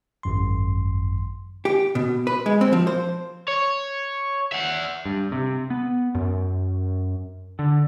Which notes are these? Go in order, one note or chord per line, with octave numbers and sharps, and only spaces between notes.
G#1 F#2 C6
G4
B2
B4
G#3
C4
F3
C5
C#5
E5 F#5
G2
C3
B3
F#2
D3